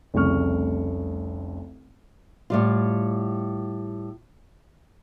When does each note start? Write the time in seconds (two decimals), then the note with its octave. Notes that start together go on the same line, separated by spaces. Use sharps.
0.14 F1 C2 C#3 A3 C#6 F6
2.50 A2 G3 F4